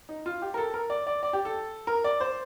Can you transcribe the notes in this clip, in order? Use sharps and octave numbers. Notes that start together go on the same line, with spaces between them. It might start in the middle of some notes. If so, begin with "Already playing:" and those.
D#4
F4
G4
A#4
A4
A#4
D5
D5
D5
G4
A4
A#4
D5
C5